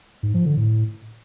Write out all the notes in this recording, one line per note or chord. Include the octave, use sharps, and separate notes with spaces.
G#2
F3
D3
A2